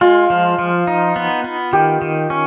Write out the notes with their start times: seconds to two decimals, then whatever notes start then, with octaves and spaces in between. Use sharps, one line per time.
0.01 G#3 F4
0.30 F3
0.59 F3
0.87 D#4
1.16 B3
1.44 B3
1.73 D#3 G4
2.02 D#3
2.30 C#4